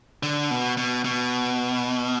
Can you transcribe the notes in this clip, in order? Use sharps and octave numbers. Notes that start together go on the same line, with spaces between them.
D3
B2
B2
B2